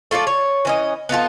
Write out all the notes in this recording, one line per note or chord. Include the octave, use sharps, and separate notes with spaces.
A3 F4 A4 D5
C#5
E3 C#4 D#5
B3 D#4 F4 A4